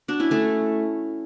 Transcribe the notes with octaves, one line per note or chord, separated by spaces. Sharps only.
D4 F#4
C#4 E4
A3 C#4